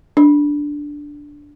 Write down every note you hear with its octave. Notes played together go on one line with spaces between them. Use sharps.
D4